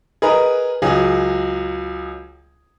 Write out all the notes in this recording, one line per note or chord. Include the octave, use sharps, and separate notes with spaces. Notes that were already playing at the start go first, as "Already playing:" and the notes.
G#4 A#4 B4 D#5 A#5
C#2 F#3 G#4